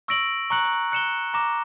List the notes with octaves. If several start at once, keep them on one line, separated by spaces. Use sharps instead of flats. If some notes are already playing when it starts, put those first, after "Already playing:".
C#6 E6 A#6 D7 F#7
A#5 C#6 F#6 C#7 F#7
F#6 C#7 E7 G7
A#5 D6 A#6 E7